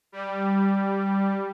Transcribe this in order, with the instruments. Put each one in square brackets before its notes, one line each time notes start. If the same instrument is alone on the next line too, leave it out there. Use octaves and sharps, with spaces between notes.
[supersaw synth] G3